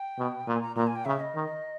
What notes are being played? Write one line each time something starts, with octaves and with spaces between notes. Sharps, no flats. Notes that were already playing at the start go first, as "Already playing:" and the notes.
Already playing: G5
B2
A#2 G#5
A#5
A#2 A#5
G#5
G5
C#3 E5
D#5
D#3